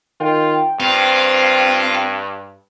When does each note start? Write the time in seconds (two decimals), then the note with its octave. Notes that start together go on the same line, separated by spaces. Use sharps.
0.20 D#3 F4 G5
0.80 G2 C4 F4